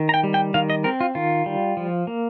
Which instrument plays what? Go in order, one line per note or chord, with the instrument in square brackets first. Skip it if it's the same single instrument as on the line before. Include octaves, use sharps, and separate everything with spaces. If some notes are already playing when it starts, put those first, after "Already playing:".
Already playing: [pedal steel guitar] D#3
A#5
G5
G3
G5
D#3 F5
D#5
C4 A#4
F4
D#3 F4
G3
F3
A#3